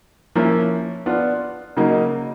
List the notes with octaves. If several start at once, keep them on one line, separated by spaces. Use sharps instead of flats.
F3 A#3 C#4 E4
B3 D4 F4
C#3 F#3 A#3 D#4